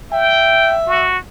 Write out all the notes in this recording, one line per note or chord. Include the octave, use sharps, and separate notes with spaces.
E5 G5
F#4